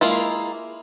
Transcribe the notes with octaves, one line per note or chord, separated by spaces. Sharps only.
G#3 A#3 E4 F4